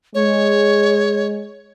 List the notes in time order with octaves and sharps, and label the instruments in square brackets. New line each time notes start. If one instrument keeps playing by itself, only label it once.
[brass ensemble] G#3 [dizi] C#5